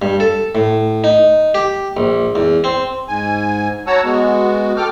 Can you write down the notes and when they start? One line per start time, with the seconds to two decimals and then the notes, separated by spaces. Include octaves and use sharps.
0.02 G2
0.20 A4
0.55 A2
1.04 D#4
1.55 G4
1.97 A#1
2.36 E2
2.64 C4
3.08 G#2 G#5
3.87 F#4 C#5 F#5 A5 A#5 E6
4.04 G#3 B3 F#4
4.77 A4 G5 D6 F6